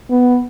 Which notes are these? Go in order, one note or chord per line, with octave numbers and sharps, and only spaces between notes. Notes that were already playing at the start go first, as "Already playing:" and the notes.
B3